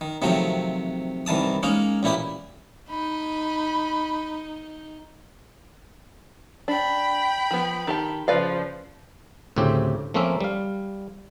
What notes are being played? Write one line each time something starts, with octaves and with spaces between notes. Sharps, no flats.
D#3
C3 D#3 F3 F#3 A3 C4
C2 D#3 E3 A5 D#6
G#3 A#3 C#4 D#4
A1 A#2 E4 G4 D#6
D#4 B5
D4 G5 B5
F3 B3
D#3 G4 A5
C#3 F3 B4 D5 F5
D2 A2 C#3 C4 G4
F3 A3 A#3 C4 C#4 E5
G3 F5